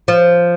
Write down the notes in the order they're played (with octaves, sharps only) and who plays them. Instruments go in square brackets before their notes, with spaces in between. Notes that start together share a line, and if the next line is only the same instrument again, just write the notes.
[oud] F3